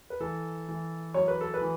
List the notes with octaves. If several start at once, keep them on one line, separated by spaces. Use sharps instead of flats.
B4
E3 A4
E3
F#2 C#5
B4
A4
B4
E3